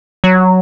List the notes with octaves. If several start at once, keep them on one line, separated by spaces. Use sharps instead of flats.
F#3